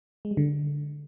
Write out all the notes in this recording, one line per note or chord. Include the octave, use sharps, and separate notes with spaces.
G#3
G3
D3